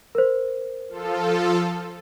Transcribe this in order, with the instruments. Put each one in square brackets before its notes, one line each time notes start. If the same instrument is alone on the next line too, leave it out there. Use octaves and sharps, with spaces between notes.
[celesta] A#4 C5
[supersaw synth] F3 F4 A4